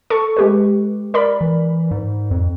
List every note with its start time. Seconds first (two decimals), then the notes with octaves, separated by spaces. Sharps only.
0.10 A4 C#6
0.37 G#3 G4 B4
1.14 A#4 D5 B5
1.41 E3
1.91 G#2
2.31 F2